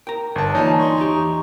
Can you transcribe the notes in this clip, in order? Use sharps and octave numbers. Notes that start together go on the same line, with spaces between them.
A#4 G5 A#5
G1 A5
E3 A#3 D#4 F4 C#5 D5 G#5 A5
C6 C#6
E2 G4 A#5